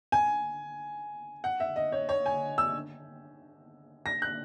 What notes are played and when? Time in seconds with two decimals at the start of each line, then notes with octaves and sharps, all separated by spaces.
0.12 G#5
1.44 F#5
1.60 E5
1.76 D#5
1.92 C#5
2.09 C#5
2.26 G#5
2.58 E6
4.06 A#6
4.22 F#6